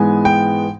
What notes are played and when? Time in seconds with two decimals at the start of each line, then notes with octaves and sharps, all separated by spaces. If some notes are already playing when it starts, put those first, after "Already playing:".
Already playing: G#2 E3 G#3 B3 G#5
0.25 G5